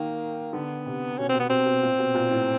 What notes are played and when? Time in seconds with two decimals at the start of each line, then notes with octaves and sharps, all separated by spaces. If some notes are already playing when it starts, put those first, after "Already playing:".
Already playing: D#3 A#3
0.53 D3 B3
0.86 C3
1.18 B2 C#4
1.29 B2 C4
1.40 B3
1.50 B2 C4
1.66 B2
1.83 A#2
1.99 B2
2.14 A#2
2.31 A2